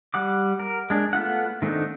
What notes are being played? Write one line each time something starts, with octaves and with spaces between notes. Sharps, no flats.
G3 F#5 D6
A#4
G#3 D4
A3 B3 F4 F#5
D#3 A3 C4 D4 D#4